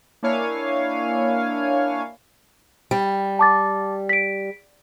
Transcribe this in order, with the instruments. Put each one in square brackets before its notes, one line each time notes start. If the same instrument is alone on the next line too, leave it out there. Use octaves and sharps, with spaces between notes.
[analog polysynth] A#3 D4 E4 C#5 F5 G#5
[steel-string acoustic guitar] G3
[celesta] A5 D6 A6
B6 D7